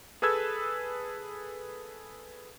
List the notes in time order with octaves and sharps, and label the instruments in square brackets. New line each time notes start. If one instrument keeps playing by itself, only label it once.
[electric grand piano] G#4 A4 B4 E6 G#6